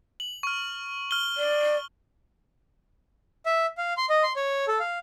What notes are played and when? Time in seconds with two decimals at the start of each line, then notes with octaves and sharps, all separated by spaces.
0.20 F#7
0.43 C#6 F6
1.11 F6 G7
1.37 D5
3.46 E5
3.78 F5
3.97 C6
4.09 D#5
4.23 C6
4.36 C#5
4.68 A4
4.80 F5